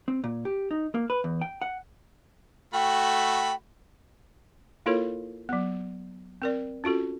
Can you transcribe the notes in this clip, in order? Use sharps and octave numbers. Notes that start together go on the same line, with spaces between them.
C4
A#2
G4
D#4
A#3
B4
E2
G5
F#5
A3 F#4 G5 B5
A#3 E4 F4 A4 A#4 C#5
F#3 B3
C4 A#4 D5
C#4 F4 F#4 A4